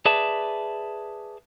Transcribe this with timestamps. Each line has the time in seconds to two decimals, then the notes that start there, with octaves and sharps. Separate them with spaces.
0.06 G#4 B4 D5 E5 A5